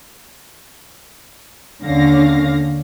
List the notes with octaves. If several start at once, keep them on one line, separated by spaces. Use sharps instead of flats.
D#2 D3 C#4 F5 A#6